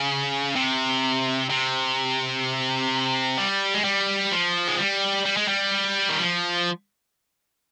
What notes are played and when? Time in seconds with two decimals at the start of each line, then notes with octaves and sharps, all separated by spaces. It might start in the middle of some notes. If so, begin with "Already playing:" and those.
Already playing: C#3
0.55 C3
1.50 C3
3.38 G3
3.74 G#3
3.84 G3
4.32 F3
4.67 G#3
4.78 G3
5.26 G3
5.37 G#3
5.48 G3
6.09 D#3
6.19 F3